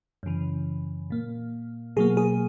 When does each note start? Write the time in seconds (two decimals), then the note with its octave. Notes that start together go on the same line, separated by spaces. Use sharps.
0.23 F#2 C#3 E3
1.10 A#2 A#3
1.96 B2 F#3 A#3 G#4
2.17 G#4